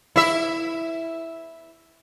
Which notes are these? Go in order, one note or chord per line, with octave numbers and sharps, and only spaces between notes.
E4 E5